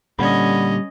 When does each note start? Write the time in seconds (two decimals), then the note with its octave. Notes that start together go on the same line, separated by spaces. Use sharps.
0.19 A#2 D3 G3 C#4 D5 D#5 F#5 B5